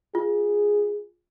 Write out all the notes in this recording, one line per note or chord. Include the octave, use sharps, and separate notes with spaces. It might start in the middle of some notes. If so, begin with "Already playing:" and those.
F4 G#4